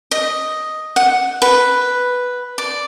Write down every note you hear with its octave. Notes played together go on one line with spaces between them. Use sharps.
D#5
F#5
B4
D5